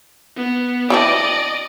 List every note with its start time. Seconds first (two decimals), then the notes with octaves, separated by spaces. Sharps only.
0.36 B3
0.90 E3 C4 D4 D5 D#5